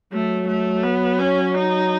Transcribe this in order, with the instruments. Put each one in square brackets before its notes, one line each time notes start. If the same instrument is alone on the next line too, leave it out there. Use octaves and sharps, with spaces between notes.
[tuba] F#3 [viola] A3
[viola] A3
B3
C#4
D#4